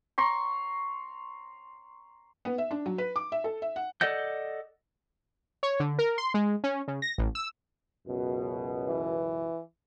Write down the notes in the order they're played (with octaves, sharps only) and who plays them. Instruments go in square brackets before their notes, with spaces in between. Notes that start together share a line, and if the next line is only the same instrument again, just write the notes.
[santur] A#5 C6 C#6
[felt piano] B3
E5
D4
F#3
B4
D6
E5
A4
E5
F#5
[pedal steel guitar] A4 D5 D#5 F#5 G6
[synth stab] C#5
D3
A#4
C6
G#3
C#4
C#3
A#6
A1
E6
[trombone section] C#2 F#2 B2
[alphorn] E3